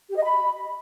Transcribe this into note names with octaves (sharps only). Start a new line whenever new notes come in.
G4
D#5
B5